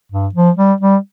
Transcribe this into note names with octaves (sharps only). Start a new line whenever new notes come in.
G2
F3
G3
G3